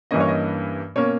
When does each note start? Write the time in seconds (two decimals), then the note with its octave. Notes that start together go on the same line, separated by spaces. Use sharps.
0.11 G2 E3 A#3 C#4 D#5
0.20 C#5
0.28 D#5
0.96 B2 A#3 C#4 C#5